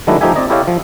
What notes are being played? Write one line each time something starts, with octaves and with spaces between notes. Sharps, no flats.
D#3 F#3 G#3 A3 D4 E4
F3 A3 D#4 G4 E5 G#5
C4 D5 D#5
E4 G4 A4 C#5 D#5 F5
F3